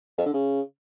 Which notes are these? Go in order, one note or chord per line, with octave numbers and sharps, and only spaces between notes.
F2
D3
C#3